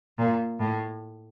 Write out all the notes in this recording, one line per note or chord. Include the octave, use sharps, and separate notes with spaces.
A#2
A2